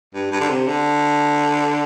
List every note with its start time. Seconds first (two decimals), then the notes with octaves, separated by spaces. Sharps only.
0.14 G2
0.32 G2
0.41 D3
0.50 C3
0.67 D3